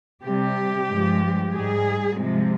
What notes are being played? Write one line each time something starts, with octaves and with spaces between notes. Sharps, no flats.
C3 G3 G4
G2 F3 G#3
G#2 G3 G#4
C3 F3 G#3